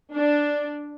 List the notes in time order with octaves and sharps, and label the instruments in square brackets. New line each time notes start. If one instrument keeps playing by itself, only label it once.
[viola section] D4